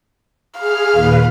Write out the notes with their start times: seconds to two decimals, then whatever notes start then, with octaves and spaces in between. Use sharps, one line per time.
0.59 G#4 F5 F6
0.93 D#2 A#2 B4